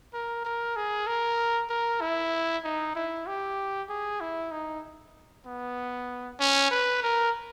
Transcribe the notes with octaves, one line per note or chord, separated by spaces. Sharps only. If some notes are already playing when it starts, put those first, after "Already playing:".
A#4
A#4
G#4
A#4
A#4
E4
D#4
E4
G4
G#4
E4
D#4
B3
C#4
B4
A#4